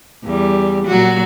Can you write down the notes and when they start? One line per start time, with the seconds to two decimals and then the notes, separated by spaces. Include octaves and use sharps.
0.24 E2 G3
0.87 A#2 F#3 F#4